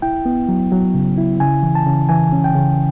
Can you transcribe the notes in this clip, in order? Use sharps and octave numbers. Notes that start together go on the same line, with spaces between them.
E4 G5
B3
F#3
F#3
C#3
E4
C#3 G#5
E3
A5
C#3
E3 G#5
C#4
G5
C#3